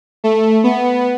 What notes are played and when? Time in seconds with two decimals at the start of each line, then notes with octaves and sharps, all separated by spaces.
0.24 A3
0.64 B3